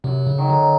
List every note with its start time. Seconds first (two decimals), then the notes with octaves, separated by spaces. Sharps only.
0.04 F#2 C3
0.27 C#3
0.38 D#3 F#3
0.50 D3